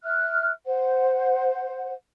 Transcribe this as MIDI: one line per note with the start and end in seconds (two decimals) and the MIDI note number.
0.04 0.50 76
0.04 0.50 89
0.04 0.50 90
0.66 1.92 72
0.66 1.92 78